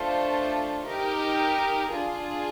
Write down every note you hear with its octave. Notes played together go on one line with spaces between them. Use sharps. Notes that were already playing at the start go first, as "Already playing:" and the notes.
Already playing: A3 D4 F4 A4 C5
D#4 G4 A#4
D4 F4 G#4